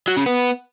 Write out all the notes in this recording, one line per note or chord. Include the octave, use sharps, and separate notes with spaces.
F#3
C#3
B3